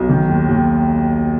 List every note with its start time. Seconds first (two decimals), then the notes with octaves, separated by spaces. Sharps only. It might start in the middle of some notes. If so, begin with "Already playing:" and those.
Already playing: B1
0.09 D#3
0.29 D#2
0.49 D#2